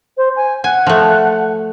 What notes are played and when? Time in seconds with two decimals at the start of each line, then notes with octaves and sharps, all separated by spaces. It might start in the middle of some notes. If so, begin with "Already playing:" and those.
0.17 C5
0.36 G#5
0.64 F#5 G#5
0.87 F3 A3